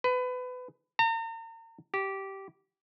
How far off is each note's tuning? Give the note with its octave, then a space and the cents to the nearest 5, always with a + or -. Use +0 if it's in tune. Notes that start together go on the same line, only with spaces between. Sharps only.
B4 +25
A#5 -40
G4 -15